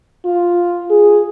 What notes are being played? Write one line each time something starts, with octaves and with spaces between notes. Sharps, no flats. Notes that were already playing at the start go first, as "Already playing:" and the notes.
F4
G#4